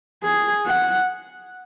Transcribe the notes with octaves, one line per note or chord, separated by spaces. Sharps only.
G#4
F#5